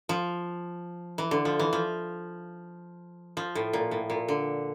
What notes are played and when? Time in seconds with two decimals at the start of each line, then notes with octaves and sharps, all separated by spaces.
0.09 F3
1.18 E3
1.31 D3
1.45 F3
1.59 E3
1.73 F3
3.37 F3
3.55 A2
3.73 A#2
3.91 A2
4.10 A#2
4.29 D3